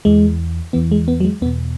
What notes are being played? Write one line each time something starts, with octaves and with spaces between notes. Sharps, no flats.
E2 E3 G#3
E2 E3 B3
G#3
B3
F#3
G#3
E2 B2 B3